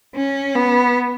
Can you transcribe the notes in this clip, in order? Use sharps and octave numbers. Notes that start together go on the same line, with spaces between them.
C#4
B3